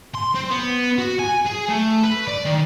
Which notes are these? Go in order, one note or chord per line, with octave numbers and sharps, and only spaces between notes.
C6
C4
B3
F#4
G#5
G#4
A3
B4
D5
D#3